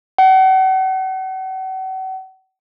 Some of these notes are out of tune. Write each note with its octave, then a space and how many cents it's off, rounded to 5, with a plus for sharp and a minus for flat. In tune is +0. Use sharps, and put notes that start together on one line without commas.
F#5 +40